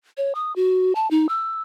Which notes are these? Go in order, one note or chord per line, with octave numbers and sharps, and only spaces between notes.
C#5
D#6
F#4
A5
D#4
E6